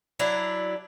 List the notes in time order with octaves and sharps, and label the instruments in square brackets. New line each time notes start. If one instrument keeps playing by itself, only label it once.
[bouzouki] F#3 D4 E4